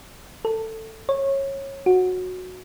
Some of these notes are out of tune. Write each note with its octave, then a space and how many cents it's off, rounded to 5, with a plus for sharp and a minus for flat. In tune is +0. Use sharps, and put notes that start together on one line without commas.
A4 +15
C#5 -20
F#4 -10